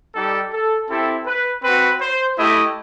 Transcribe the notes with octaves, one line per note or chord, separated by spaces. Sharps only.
G3 D#4 G4 A4
A4
C4 E4 G4 A4
B4
C4 F#4 B4
C5
A3 E4 G4 D#5